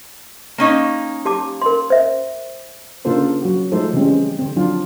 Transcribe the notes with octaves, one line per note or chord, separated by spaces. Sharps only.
A#3 C#4 D#4
G4 A5 D6
A#4 C6
C5 E5
C#3 A#3 D4 F4 A4 C5
F#3 F#4
F3 G#3 A3 D#4 A4 C5
C#3 E3 G3 G#3 C4 C#4
D3 C4
F3 F#3 D4 F4